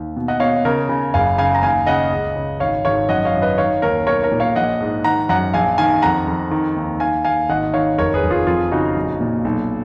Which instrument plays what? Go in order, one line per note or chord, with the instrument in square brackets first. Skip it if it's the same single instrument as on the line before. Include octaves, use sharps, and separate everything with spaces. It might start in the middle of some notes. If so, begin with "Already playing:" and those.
Already playing: [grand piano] D#2
B2
D#5 F#5
B2 C#5 F5
C#3 A#4 C#5
C#3
F#1 F5 G#5
C#3 F5 G#5
A#5
D#2 F5 G#5
C#3 D#5 F#5
C#2
C#3
G#1 C#5 F5
G#1 C#5 F5
F#2 D#5 F#5
C#5 F5
F#2
B4 D#5
D#3 C#5 F5
D#2 A#4 C#5
B1 A#4 C#5
A#4 C#5
A#2
C#5 F5
A#1 D#5 F#5
G#2
D#3 F#5 A#5
F#2 F#5 A#5
A#1 F5 G#5
D#3 F5 G#5
F2 F#5 A#5
F2
D#3
D#2
D#2 F5 G#5
D#2 F5 G#5
G#1 D#5 F#5
D#3 C#5 F5
F1 A#4 C#5
G#4 B4
F1
F4 G#4
F2 F4 G#4
C#3 D#4 F#4
A#1
A#2
B1